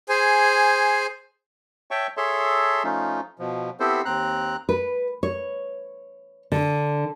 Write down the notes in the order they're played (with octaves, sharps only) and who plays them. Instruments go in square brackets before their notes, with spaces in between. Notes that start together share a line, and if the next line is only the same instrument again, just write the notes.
[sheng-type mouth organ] G#4 C5 G#5
[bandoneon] C#5 E5 G5 A5 C#6
G#4 A4 C#5 E5 A5 C6
F3 A3 C#4 D#4 F4
B2 F3
B3 C4 E4 G4 A4 C5
D#2 C4 A#5 F#6
[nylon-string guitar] B4
C#5
D3